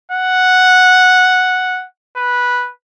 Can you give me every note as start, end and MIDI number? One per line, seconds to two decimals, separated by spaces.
0.11 1.86 78
2.17 2.70 71